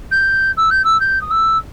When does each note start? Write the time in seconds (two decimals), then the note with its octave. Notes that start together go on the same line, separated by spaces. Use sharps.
0.11 G6
0.57 E6
0.71 G6
0.84 E6
1.00 G6
1.21 D#6
1.31 E6